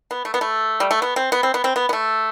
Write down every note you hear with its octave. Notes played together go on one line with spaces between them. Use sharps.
B3
A3
B3
A3
G3
A3
B3
C4
B3
C4
B3
C4
B3
B3
A3